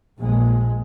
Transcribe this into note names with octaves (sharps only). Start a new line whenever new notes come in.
A#1 G#3